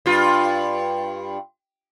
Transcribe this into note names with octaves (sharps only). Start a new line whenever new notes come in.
G2 F4